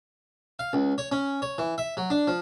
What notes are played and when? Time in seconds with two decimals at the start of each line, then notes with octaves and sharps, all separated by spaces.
0.59 F5
0.73 C#2
0.98 C#5
1.12 C#4
1.42 C#5
1.58 E3
1.78 E5
1.97 F#3
2.10 D4
2.28 F3